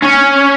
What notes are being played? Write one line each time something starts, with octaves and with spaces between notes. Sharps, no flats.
C#4